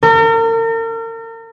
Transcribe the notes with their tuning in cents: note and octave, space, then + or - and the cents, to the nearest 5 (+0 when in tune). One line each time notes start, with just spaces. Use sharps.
A#4 -40